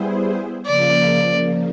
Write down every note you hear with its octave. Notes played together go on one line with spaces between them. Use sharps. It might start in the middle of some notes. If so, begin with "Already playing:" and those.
Already playing: G3 B3 E4 G#4 C5
C#3 F3 A#3 D5